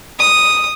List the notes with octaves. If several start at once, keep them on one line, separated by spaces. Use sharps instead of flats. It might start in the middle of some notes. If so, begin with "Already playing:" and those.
D#6